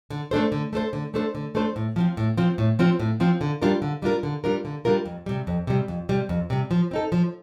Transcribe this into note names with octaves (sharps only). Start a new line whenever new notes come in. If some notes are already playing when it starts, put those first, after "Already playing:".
D3
A3 D4 A4 C5
D3
A3 D4 A4 C5
D3
A3 D4 A4 C5
D3
A3 D4 A4 C5
A2
F3 C4 F4
A2
F3 C4 F4
A2
F3 C4 F4
A2
F3 C4 F4
D3
G3 D4 F4 A#4
D3
G3 D4 F4 A#4
D3
G3 D4 F4 A#4
D3
G3 D4 F4 A#4
F2
C3 G3
F2
C3 G3
F2
C3 G3
F2
C3 G3
F3
C4 D#4 A4
F3